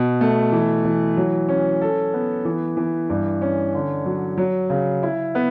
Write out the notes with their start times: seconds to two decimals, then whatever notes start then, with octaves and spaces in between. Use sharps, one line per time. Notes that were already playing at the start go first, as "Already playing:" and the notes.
Already playing: B2
0.21 A3
0.52 E3
0.84 E3
1.17 F#3
1.48 C#4
1.81 A4
2.14 B3
2.45 E3
2.77 E3
3.10 G2
3.42 C#4
3.74 D3
4.06 F#3
4.38 F#3
4.70 C#3
5.03 E4
5.35 B3